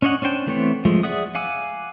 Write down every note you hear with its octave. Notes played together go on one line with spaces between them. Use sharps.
C#4 D4 C#5 D#5 F#5
C#4 D4 C5 G5 A5
E3 A3 B3 C4 C#5
F3 G#3 A3
G#4 D5 E5 F#5 D#6
F5 F#5 G#5 D6 E6